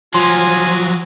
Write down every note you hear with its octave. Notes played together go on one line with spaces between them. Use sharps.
F3 F#3 F4 G#5 C6